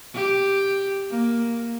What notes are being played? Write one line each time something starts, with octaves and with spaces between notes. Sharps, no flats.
G4
A#3